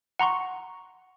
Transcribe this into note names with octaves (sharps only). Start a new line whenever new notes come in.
F#5 A#5 C6 C#6